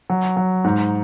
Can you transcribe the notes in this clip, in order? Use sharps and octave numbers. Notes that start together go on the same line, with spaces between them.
F#3
F#3
G#2